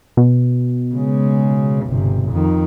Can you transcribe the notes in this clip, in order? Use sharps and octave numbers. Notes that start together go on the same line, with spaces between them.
B2
C#3 G#3
G1 C3
F2 D#3